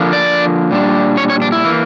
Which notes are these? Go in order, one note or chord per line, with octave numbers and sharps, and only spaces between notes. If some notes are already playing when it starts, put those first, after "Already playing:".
Already playing: D3 F3 A#3 D4
D5
A#2 G3 D4
C#5
C#5
D4
E4
E3 A#3